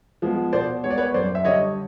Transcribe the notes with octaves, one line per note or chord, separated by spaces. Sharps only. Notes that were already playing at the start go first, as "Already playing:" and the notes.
F3 G#3 B3
B2 C5 D5
G#3 B3 C#5
D5
B4 C#5
F#2 C5 D5
E5
D3 G3 C#5 D#5